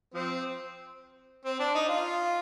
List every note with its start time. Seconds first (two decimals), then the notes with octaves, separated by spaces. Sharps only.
0.14 F3 C4
1.45 C4
1.60 D4
1.74 D#4
1.89 F4